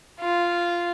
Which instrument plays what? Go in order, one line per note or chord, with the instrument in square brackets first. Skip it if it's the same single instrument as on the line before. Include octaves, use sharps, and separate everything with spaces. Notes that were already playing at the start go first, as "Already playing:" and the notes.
[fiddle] F4